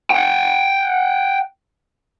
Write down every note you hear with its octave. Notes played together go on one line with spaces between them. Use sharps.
F#5 G5